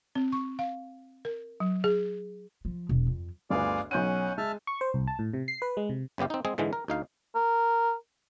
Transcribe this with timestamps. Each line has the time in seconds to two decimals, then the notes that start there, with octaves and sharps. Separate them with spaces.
0.15 C4
0.32 C#6
0.59 F5
1.25 A#4
1.60 F#3
1.84 G#4
2.65 F3
2.89 E1
3.07 F2
3.50 G1 D2 G#4 B4 D5 F5
3.91 B1 C#4 F#5 G6 D#7
4.38 G#3 E5 A5 F6
4.67 C#6
4.81 C5
4.94 C2
5.07 A5
5.19 A2
5.33 C3
5.48 C7
5.62 B4
5.77 G#3
5.89 C3
6.18 G1 C#3 B3 G4 F5
6.30 C4 D#4
6.45 G#3 C4 G#4
6.58 G#2 D3 E3 G#3
6.73 A#4
6.88 D2 D#4 F5
7.35 A#4